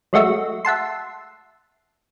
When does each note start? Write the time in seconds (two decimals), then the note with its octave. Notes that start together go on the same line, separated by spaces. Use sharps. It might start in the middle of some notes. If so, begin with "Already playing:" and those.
0.13 F#3 G#3 A3 F#4 E5
0.65 E5 F#5 A5 C6